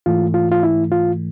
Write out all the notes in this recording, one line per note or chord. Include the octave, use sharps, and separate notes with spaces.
G#2 E3 A3 F4
F4
F4
E4
F4